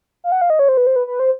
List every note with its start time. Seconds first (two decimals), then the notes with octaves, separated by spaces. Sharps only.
0.24 F5
0.32 F#5
0.41 F5
0.50 D#5
0.59 C#5
0.69 C5
0.77 B4
0.87 C5
0.96 B4
1.07 B4
1.20 C5